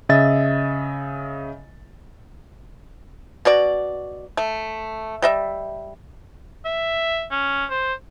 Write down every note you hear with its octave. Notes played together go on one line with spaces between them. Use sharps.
C#3 D#5 E5 A6
B2 F#4 D5
A3
G3 D#5 E5
E5
C#4
C5